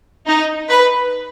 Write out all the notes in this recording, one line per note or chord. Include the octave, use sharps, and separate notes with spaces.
D#4
B4